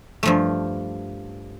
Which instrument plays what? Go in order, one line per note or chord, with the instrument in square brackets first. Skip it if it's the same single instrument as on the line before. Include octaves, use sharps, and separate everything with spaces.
[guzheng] G2 F3 A3